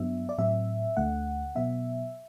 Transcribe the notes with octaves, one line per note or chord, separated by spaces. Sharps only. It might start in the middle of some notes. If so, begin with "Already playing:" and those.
Already playing: G2 F#3 B3 D4 E5
D5
A2 F#3 C4 E5
D2 D3 A3 F#5
B2 F#3 B3 E5